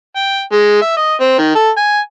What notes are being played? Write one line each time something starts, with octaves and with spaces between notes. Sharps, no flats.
G5
G#3
E5
D#5
C4
D#3
A4
G#5